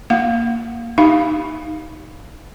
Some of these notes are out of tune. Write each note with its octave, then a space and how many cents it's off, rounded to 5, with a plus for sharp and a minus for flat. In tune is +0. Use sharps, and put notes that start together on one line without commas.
A#3 +0 F5 +0
D#4 +0 G4 +0 F5 +0